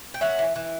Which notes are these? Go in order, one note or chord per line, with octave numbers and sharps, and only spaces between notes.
G5
C#4 E5 F#5
E3
E3